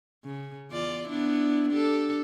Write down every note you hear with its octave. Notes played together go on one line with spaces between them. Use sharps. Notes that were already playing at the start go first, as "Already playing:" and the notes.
C#3
E2 F4 D5
B3 D4 E4
D4 G4 A4